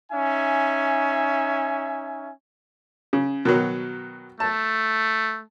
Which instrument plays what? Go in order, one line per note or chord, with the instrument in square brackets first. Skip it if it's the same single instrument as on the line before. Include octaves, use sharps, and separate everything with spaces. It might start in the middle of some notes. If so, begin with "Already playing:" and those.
[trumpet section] C#4 D#4 E5 G#5
[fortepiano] C#3
B2 D#3 F#3
[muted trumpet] A3 [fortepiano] A5